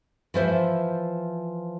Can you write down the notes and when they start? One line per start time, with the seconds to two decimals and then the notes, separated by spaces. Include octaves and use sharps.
0.34 E3 F3 C5 E5